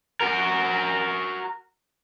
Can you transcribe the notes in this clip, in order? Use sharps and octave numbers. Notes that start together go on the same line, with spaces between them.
F#4 A#4